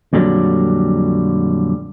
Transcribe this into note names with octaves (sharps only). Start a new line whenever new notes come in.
F2 A#2 D3 F#3 G3